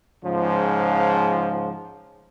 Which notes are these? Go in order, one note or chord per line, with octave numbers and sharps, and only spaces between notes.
G#2 C#3 F3